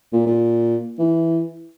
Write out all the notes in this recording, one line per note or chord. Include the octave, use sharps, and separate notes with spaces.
A#2
A#2
E3